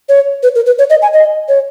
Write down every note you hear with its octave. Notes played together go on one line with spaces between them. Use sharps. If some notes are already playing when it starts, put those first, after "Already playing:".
C#5
B4
A#4
B4
C#5
D#5
G#5
D#5
C#5